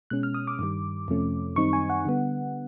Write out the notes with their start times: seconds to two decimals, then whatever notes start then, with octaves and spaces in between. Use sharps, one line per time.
0.10 B2 G#3 C#4 F#6
0.23 F6
0.34 D#6
0.47 D6
0.59 G2 D#3 G3
1.08 F2 C3 F3 A3 C#4
1.56 F#2 D#3 G3 C4 D#4 C#6
1.73 G#5
1.90 F#5
2.05 D3 G3 B3